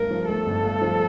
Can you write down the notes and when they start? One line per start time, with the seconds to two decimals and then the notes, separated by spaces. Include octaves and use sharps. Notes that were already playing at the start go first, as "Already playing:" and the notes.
Already playing: G1 G2 A3 A#4
0.11 F3
0.28 A3 A4
0.47 G1
0.63 G2
0.82 F3